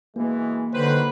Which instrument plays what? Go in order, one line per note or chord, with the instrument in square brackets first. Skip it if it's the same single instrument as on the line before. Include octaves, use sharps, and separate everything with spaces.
[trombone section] B2 E3 G#3 [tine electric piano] A#3
[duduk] D3 [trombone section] D#3 F#3 C5 [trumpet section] B4